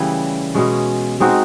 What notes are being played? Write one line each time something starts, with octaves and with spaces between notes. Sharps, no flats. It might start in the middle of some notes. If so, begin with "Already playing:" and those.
Already playing: C#3 E3 G3 A3
B2 G#3 C#4
G#3 C4 D#4 F#4